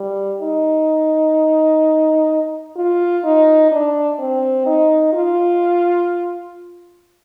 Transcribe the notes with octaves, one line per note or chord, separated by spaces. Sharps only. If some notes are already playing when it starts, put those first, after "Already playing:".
Already playing: G3
D#4
F4
D#4
D4
C4
D#4
F4